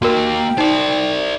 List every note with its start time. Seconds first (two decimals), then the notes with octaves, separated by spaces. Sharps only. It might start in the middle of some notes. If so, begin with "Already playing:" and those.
0.02 D#2 A#3 F#4 A#4 G5
0.58 D#4 C5 D5